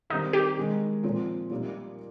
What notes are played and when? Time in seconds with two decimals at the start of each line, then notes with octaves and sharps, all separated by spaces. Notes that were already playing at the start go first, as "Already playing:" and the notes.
0.10 D#3 G3 C4 D#4
0.33 G4
0.57 D#3 G#3 D#4
1.03 A#2 F3 C4
1.50 A#2 G3 A#3 D#4 A#4